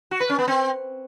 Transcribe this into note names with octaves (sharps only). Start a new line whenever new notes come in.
F#4
B4
C#4
B3
C4